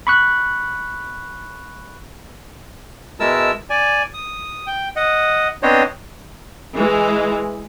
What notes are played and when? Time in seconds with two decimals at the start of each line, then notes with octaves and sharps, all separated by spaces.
0.07 B5 C#6 F#6
3.20 B2 G#3 E4 A#4 A5 E6
3.70 D5 G#5
4.14 D#6
4.67 G5
4.96 D#5 F#5
5.63 B3 C4 D4 C5 C#5 D#5
6.74 E3 G#3